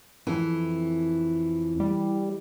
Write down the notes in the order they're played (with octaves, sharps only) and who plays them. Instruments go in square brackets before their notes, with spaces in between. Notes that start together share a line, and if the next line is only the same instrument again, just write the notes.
[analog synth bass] F2 [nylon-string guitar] E3
[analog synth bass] G3